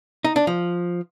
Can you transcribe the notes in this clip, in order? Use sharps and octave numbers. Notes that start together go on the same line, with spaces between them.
D#4
D4
F3